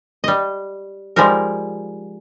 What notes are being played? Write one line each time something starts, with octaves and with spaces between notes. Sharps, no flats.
G3 D#5
F3 G3 G#3 D#4 A#4